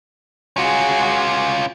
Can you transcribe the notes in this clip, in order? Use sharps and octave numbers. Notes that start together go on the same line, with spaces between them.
C#4 F4 F#4 G#4